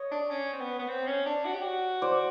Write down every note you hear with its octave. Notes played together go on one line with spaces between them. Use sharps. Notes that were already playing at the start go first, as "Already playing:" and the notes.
Already playing: C#5 D#5
D4
C#4
C4
B3
B3
C4
C#4
D4
F#4
G4
F#4
C5 D5